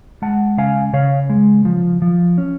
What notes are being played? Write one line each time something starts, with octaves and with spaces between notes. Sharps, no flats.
G#3 F#5 A5
C#3 F5 G#5
C#3 C#5 F5
G#3
F3
F3
C#4